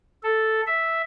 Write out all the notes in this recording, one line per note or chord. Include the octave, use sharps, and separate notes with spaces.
A4
E5